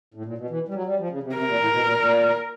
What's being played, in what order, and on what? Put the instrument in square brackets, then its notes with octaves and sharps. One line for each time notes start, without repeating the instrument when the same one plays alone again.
[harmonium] A2
A#2
B2
E3
G3
F#3
G3
F3
C#3
C3
[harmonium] C3 [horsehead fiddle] A#4
[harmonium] A#2
A2
B2
A#2
A#2